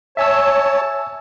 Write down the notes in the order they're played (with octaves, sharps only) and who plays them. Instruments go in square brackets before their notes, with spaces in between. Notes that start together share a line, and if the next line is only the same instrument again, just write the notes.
[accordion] C#5 A5 [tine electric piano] E5 G#5 E6